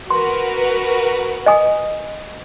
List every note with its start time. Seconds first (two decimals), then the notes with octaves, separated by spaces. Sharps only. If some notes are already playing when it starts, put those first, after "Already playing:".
0.10 F#4 A#4 B4 C6
1.46 D#5 G#5 D#6